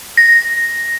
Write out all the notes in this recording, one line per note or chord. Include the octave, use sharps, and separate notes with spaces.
A#6